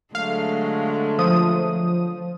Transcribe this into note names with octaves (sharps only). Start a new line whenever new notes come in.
D3 F#3 G#3 A3 F5
F3 D#6